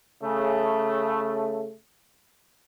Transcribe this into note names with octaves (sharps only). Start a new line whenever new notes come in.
C#3 A3